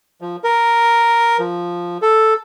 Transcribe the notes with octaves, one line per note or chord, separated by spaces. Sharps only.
F3
A#4
F3
A4